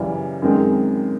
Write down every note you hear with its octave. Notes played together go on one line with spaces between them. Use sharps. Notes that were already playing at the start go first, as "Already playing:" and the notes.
Already playing: F#2 C#3 E3 G3
F#2 D#3 G#3 C4